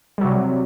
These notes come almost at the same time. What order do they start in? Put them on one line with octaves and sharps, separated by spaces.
G3 F#3 C3